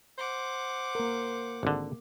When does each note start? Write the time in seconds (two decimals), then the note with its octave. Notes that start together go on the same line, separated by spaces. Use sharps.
0.18 C5 F#5 D6
0.95 A#3 A#4
1.63 G#1 D3